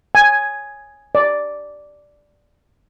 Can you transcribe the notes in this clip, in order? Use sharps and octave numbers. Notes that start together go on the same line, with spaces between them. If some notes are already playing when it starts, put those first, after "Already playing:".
G#5
D5